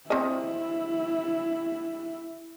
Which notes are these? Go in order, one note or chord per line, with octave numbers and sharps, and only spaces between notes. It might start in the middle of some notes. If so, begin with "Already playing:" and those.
C4 E4 D#5